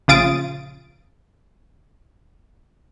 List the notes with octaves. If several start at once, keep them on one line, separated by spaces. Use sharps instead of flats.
A#1 C#3 F4 D#6 A6 D7